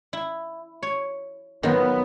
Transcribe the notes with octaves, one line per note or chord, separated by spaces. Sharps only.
E4
C#5
D#3 F#3 B3 F4